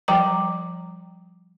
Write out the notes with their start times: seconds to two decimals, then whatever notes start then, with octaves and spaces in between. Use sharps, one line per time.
0.08 F3 G3 G5 A#5